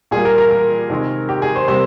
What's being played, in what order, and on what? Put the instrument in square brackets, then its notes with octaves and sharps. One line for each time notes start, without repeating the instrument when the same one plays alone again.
[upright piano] A#2 G3 A#3 G#4
A#4
A#4
A#4
C3 D#3 G#3
G4
G#4
C5
C3 G3 A#3 C5